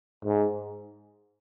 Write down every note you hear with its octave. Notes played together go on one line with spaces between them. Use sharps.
G#2